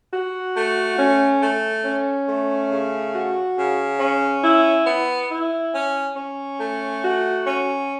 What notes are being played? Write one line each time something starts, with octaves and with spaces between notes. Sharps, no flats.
F#4
A3
C#4
A3
C#4
A3
C#3
F#4
C#3
C#4
E4
B3
E4
C#4
C#4
A3
F#4
C#4